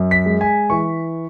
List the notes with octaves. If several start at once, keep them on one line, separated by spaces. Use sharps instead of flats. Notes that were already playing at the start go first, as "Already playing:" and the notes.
Already playing: F#2
B6
G#3
G#5
E3 C#6